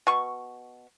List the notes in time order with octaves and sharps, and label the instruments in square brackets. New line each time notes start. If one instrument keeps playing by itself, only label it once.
[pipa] B2 C#6